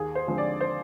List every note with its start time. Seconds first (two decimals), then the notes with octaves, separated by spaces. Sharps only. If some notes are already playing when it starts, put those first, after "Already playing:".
Already playing: D#2 G#4
0.15 C5
0.27 D3 F3 G#3 C4
0.38 D5
0.61 C5